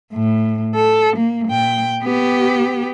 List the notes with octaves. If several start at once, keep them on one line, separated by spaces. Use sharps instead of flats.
A2
A4
A#3
A#2 G5
B3 G4